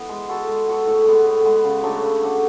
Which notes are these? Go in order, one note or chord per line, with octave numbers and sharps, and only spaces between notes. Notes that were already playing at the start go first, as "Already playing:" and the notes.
Already playing: E3 B3
G#3
B3 F#4 A4
G#3
B3 F#4 A4
A2
G#3 B3
A2
G#3 B3
C#3
F#3 A3 D4
C#3
F#3 A3 D4